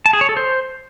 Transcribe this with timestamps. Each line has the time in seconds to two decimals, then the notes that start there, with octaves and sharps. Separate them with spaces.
0.06 A5
0.13 G#4
0.21 C#5
0.29 A4
0.37 C5